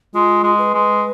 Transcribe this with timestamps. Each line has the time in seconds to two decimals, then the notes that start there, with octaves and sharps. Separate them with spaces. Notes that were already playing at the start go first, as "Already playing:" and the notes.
0.14 G#3 F4
0.44 G#3
0.58 B4
0.74 G#3